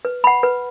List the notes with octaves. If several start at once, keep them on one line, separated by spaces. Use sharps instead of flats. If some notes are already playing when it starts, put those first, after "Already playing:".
B4
F#5 B5
B4